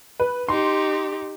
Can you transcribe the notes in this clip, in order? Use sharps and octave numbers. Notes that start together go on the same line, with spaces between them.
B4
D#4 G4 C6